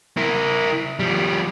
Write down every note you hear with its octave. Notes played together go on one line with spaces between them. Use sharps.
E4 A#4
F3 G3